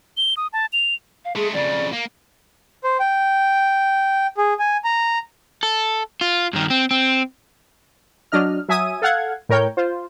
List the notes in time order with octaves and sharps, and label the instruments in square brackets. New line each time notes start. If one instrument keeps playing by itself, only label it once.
[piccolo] G7
D#6
A5
F7
[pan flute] F5
[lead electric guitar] G#3 A3 [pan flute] G#4
[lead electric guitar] F2 C#3 [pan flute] D5
[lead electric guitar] A#3
[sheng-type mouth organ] C5
G5
G#4
G#5
A#5
[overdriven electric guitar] A4
F4
G2 D#3
C4
C4
[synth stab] F#3 D4 D#5 F6
F#3 E5 G#5 D#6 D#7
A4 F5 F#5 G#6
A2 A#4 C#5 G5 G6
F4 C5